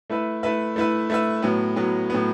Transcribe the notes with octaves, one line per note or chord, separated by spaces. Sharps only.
A3 E4 B4 E5
A3 E4 B4 E5
A3 E4 B4 E5
A3 E4 B4 E5
A2 F#3 B3
A2 F#3 B3
A2 F#3 B3